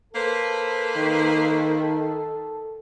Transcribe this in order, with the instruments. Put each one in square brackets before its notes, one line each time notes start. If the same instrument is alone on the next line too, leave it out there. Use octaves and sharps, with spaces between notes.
[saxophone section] A#3 B4 C5 [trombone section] A4
[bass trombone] D#3